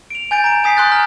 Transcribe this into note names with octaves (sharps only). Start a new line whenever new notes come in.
D7 F7
G#5 G6 A6 D7
A#5 D7
G#5 D#6 B6 C7
C6 D#6 F#6 G6 A6
G#5 A#5 F6